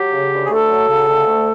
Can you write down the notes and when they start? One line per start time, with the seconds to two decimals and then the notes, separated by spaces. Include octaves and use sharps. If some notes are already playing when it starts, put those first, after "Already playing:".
Already playing: F#3 G4
0.12 C#3
0.32 D2
0.45 G#4
0.50 A3 A4
0.70 F#3
0.89 C#3
1.08 D2
1.27 A3